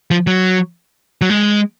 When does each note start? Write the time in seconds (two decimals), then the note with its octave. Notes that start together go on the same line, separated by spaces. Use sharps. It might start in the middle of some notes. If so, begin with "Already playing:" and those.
0.11 F3
0.27 F#3
1.21 F#3
1.30 G#3